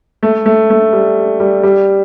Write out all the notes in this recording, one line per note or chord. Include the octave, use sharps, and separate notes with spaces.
A3
A3
A3
G3
G3
G3